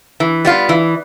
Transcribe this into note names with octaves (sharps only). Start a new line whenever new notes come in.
E3
G3 B3 F4
E3